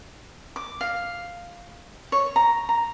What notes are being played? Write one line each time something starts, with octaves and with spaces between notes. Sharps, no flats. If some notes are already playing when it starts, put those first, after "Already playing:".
D6
F5
C#5
A#5
A#5